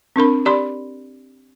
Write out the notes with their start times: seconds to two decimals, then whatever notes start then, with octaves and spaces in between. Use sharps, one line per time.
0.16 C4 D4 A#4 B5
0.45 G4 D5 B5 C6